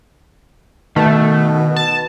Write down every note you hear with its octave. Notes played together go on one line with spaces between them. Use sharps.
B2 D#3 A3
A5